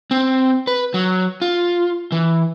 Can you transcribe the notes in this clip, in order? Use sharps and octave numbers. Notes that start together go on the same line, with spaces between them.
C4
B4
F#3
F4
E3